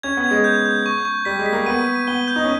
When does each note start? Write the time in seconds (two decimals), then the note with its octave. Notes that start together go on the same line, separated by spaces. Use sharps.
0.03 C#4 G#6
0.17 B3
0.24 G#6
0.31 G#3
0.44 G6
0.65 G6
0.86 C#6
1.05 C#6
1.25 G3 B6
1.39 G#3
1.46 B6
1.53 A#3
1.66 B3 D#7
1.87 D#7
2.07 B3 G7
2.28 G6
2.36 D#4
2.45 C#4